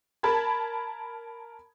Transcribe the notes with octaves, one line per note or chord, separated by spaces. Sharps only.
A#4 A5 B5 G#6